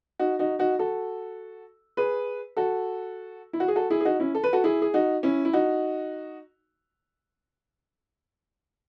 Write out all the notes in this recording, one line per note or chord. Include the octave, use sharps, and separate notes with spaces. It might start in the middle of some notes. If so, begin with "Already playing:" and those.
D#4 F#4
D#4 F#4
D#4 F#4
F#4 A4
G#4 B4
F#4 A4
E4
F#4
G#4
F#4 A4
E4 G#4
G#4
D#4 F#4
C#4 E4
A4
B4
F#4 A4
E4 G#4
G#4
D#4 F#4
C#4 E4
E4
D#4 F#4